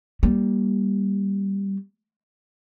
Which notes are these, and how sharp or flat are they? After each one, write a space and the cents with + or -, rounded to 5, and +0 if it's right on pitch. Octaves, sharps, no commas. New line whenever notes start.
G3 +0 A#3 +25